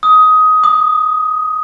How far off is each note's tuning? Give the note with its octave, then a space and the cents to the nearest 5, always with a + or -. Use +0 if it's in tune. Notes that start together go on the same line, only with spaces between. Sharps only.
D#6 +15
D#6 -35